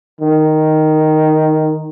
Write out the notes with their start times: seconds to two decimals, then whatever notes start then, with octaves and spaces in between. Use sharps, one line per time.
0.21 D#3